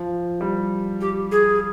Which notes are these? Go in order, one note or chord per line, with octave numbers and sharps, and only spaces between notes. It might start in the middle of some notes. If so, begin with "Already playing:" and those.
Already playing: F3
G3
G4
G#4